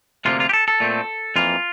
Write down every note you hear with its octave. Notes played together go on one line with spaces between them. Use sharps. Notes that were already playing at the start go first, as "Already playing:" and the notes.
D2 C3 F3 A#3 F4
F4
G4
A4
A4
A#2 A3 C4
F2 E3 A#3 F4